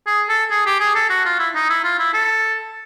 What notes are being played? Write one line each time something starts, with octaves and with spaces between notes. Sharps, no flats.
G#4
A4
G#4
G4
G#4
A4
F#4
F4
E4
D#4
E4
F4
E4
A4